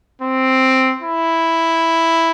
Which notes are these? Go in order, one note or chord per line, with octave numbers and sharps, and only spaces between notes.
C4
E4